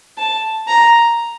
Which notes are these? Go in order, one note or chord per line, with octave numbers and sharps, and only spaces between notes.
A5
A#5